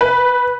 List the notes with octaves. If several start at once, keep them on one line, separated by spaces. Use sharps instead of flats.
B4